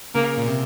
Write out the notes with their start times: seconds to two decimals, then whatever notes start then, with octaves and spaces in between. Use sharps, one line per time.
0.15 C#3 A#3
0.38 A#2
0.47 C3